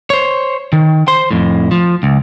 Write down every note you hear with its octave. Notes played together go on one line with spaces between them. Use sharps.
C5 C#5
D#3
C5 C6
F2 A2
F3
C#2